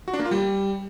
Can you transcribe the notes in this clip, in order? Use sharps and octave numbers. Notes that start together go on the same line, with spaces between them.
F#4
D4
A#3
F4
G3